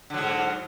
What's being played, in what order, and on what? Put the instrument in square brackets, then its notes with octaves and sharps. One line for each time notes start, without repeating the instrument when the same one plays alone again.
[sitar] D3
F#3
G#2